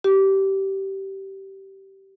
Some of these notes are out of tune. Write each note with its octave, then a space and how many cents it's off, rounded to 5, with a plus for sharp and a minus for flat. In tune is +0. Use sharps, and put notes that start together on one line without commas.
G4 -20